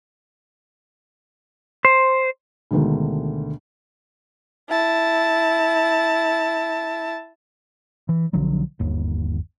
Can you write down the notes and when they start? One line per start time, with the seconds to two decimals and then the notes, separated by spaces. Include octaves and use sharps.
1.85 C5
2.71 D2 B2 D3 D#3 G#3
4.69 E4 A5
8.09 E3
8.33 B1 D3 F3 F#3
8.80 G1 D#2